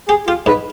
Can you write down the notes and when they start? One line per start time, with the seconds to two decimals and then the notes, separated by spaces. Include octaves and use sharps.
0.08 G4 G#4
0.27 F4 G4
0.46 G#2 B4